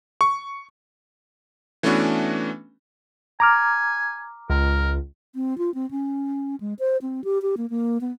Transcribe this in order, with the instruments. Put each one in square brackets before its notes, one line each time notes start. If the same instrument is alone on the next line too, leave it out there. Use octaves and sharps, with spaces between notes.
[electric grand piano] C#6
E3 A3 B3 C#4 D4 F#4
[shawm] G#5 [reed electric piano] A#5 D6 F6
[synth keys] C#2 [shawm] A#4
[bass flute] C4
F4
C4
C#4
G#3
C5
C4
G4
G4
A#3
A#3
B3